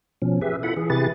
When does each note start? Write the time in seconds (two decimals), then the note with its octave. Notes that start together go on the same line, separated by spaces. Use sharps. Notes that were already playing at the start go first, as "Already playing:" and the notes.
0.22 B2 F3 C#4
0.41 G4 G#4 B4 E5
0.63 E4 F4 A4 F#5 B5
0.77 E3 G#4
0.90 C3 E4 G4 G#4 B4 A6